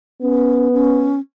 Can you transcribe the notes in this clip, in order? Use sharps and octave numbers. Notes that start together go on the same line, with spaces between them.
B3 C#4
C#4